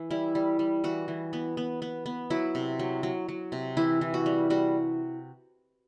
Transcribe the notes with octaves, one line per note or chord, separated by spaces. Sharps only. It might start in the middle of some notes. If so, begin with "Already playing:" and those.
Already playing: E3
G3 E4
G3
G3
E3 F#4
E3
B3
B3
B3
B3
F#3 E4
C3
F#3
F#3
F#3
C3
E3 E4
E3
F#4
G3
G3 F#4